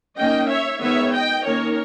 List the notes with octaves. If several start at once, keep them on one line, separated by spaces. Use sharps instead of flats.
D#3 A#3 C#4 D#5 G5
C#5 E5
D#3 G#3 B3 C#5 E5
D#5 G5
D#3 A#3 C#4 A#4 C#5